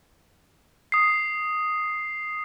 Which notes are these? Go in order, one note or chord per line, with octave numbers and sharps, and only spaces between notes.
D#6 C7